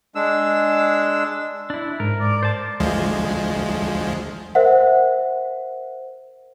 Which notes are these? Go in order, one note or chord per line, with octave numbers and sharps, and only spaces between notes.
G#3 D4 E6
D4 E4
G#2 A#4
D5
C5 A5
D2 F3 G#3
A#4 C5 E5 F#5